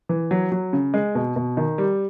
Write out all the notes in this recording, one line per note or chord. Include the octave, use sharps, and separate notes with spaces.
E3
F#3
F#3
C#3
G#3
B2
B2
D#3
G3